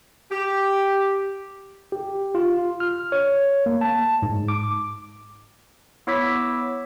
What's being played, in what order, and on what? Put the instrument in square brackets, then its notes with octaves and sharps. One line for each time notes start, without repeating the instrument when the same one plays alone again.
[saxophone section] G4
[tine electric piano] G4
F4
F6
C#5
A#3
A5
G#2
D6
[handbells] B3 E4 C#5 D6 E6 B6